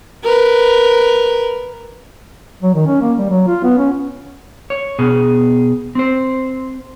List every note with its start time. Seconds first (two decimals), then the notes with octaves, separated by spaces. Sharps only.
0.24 A#4 B4
2.63 F#3
2.75 D#3
2.87 C#4
3.02 A#3
3.18 G3
3.30 F#3
3.48 F4
3.64 B3
3.78 C#4
4.70 C#5
4.99 B2 B3 G#4
5.95 C4 C5